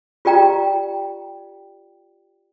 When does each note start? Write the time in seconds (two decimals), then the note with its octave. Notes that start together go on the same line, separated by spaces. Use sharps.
0.25 F4 G4 D5 G5 A#5